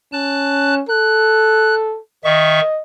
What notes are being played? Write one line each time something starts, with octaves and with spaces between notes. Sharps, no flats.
C#4 A5 F#6
A4 F#6
D#3 D#5 E5 C#6